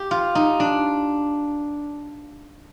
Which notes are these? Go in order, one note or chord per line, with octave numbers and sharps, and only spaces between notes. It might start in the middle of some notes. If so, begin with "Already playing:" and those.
Already playing: G4
F4
D#4
D4